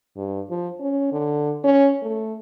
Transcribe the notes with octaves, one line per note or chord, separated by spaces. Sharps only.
G2
F3
C#4
D3
C#4
A3